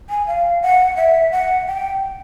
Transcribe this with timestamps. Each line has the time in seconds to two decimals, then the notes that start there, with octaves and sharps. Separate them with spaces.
0.10 G#5
0.27 F5
0.62 F#5
0.97 E5
1.32 F#5
1.67 G5